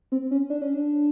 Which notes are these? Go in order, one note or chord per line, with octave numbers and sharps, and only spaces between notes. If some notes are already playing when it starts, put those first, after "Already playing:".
C4
C#4
D4
C#4
D4